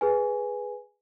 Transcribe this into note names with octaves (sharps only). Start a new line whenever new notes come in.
G#4 B4 G#5